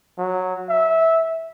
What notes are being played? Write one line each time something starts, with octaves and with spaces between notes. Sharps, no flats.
F#3
E5